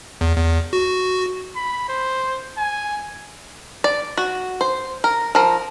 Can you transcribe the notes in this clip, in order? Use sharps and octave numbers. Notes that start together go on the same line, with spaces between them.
E2
E2
F#4
B5
C5
G#5
D5
F#4
C5
A#4
F3 A#4